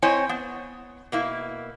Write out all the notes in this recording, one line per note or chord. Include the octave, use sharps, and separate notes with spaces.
C4 E4 C5 C#5 D#5 G#5
B3
B2 A#3 E4